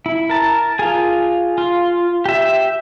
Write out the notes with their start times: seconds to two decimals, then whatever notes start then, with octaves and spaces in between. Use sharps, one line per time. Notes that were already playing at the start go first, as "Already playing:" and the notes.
0.06 E4
0.30 A#4 A5
0.79 F4 G#4
1.58 F4
2.26 G4 E5